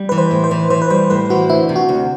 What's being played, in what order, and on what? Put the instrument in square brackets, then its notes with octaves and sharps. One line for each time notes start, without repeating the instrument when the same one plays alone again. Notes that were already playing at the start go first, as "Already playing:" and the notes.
Already playing: [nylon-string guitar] G3
[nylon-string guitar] E3 [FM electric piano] B4
[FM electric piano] C5
[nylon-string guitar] A2
[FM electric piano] C5
[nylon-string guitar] E3
[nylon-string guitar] E3 [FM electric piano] C5
[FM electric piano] B4
[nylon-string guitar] G3 [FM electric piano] C5
[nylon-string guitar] A2 [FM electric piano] B4
[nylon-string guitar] E3 [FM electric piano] F#4
[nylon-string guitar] D2 [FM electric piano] E4
[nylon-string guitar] C3
[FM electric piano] F#4
[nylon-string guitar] D2